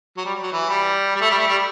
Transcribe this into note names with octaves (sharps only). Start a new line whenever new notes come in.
F#3
G3
F#3
E3
G3
G3
A3
G3
A3
G3